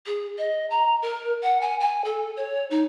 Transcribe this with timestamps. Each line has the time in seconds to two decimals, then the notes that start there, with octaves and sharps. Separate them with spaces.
0.06 G#4
0.38 D#5
0.70 A#5
1.02 A#4
1.43 F#5
1.61 G#5
1.80 G#5
2.04 A4
2.36 C#5
2.70 D#4